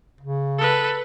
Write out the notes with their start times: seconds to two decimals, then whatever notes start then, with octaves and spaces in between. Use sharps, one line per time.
0.21 C#3
0.58 A4 B4